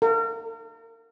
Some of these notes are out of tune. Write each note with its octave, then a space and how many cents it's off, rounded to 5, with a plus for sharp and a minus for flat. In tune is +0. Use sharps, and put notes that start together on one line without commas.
A#4 -40